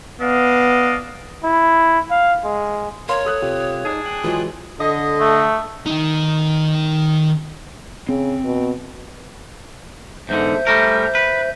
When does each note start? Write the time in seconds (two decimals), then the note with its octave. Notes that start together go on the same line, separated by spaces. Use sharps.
0.21 B3 D4 D#5 F5
1.44 E4
2.11 F5
2.44 G#3
3.09 A#4 C#5 F5 C6
3.25 A4 D#6 F#6
3.42 C3 F4 G4
3.85 D4 D#4 G#4
4.06 G5 G#5 F#6
4.24 E3 F#3 G#3 F4
4.80 D3 D#5
5.20 A3
5.87 D#3 D#4
8.09 C#3 C4
8.44 B2
10.29 E2 G#2 D3 C5 E5 G6
10.67 G3 A3 A#4
11.15 B4